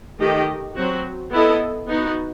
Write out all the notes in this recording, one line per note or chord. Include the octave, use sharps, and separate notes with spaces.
D#3 A3 D#4 G4 D#5
F#3 C4 F#4
B3 E4 A4 D#5
B3 D#4 F#4